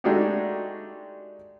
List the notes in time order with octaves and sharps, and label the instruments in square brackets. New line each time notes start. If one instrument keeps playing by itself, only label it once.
[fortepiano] G#3 A3 D4 D#4 F#4 G4